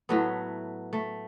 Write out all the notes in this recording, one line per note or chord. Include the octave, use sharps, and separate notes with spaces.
A2 F#3 A3 B3
A3